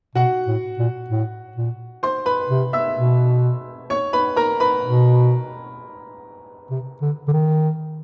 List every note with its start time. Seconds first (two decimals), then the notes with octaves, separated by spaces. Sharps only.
0.15 B2 F#4 F#5
0.47 A2
0.79 A#2
1.10 A2
1.56 A#2
2.03 C5 C6
2.26 B4 B5
2.49 C3
2.73 E5 E6
2.96 B2
3.90 C#5 C#6
4.13 B4 B5
4.36 A#4 A#5
4.60 B4 B5
4.84 B2
6.70 C3
7.02 D3
7.28 D3
7.33 D#3